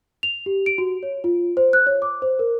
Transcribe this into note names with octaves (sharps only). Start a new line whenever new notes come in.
F7
G4
D7
F#4
C#5
F4
C5
F#6
C#5
D6
C5
A#4